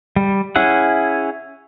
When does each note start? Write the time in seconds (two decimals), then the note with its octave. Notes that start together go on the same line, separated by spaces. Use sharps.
0.16 G3
0.56 C#4 E4 G#4 F#5